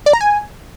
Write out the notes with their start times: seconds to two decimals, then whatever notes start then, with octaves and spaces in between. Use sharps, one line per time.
0.06 D5
0.13 A#5
0.21 G#5